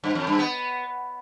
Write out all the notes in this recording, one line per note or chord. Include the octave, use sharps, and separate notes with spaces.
G2
F2
G2
B3